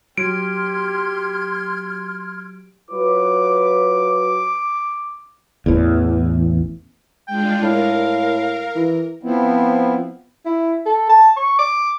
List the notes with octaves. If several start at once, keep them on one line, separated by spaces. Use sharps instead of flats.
F#3 G4 C6 F6 G#6 D7
F#3 F4 B4 D6
A1 E2
G#3 D4 F4 G5
A2 A#4 F5
E3
F3 B3 C4 E4
E4
A4
A5
C#6
D6